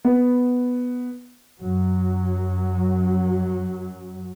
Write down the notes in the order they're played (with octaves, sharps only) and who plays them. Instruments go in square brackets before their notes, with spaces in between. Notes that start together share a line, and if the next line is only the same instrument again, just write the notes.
[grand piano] B3
[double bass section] F#2 F#3